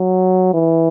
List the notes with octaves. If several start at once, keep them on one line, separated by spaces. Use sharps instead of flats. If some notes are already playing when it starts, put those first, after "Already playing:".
Already playing: F#3
E3